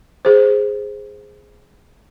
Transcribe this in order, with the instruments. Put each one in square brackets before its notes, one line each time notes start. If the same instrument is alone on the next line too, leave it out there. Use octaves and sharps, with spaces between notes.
[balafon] G#4 C5